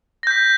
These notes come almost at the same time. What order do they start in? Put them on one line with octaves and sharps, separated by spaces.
A#6 G6 B6